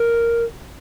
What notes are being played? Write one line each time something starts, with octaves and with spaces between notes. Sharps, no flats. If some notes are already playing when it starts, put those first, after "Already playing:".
Already playing: A#4